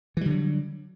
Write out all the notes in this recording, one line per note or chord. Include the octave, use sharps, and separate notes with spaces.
D3 E3 F#3 G3